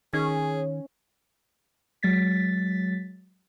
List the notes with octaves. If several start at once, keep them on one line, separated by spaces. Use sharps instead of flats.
D#3 C#4 G#4
F#3 G#3 A6 B6